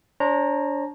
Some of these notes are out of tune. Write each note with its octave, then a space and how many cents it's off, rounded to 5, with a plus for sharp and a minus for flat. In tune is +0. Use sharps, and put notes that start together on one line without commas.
D4 -25 C5 +45 A#5 -5